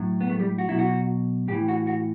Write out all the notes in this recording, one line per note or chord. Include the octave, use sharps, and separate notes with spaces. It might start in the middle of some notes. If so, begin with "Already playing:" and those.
Already playing: A2 F#3
B3
A3
G3
F#4
B2 F#3 E4
F#4
A2 E3 G4
F#4
F#4